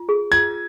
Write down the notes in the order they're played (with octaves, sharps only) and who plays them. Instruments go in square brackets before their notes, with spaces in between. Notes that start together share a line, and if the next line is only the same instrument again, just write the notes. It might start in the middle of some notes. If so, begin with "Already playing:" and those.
Already playing: [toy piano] F4
G#4
[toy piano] F4 [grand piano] G#6